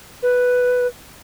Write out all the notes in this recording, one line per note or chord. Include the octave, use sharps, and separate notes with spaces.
B4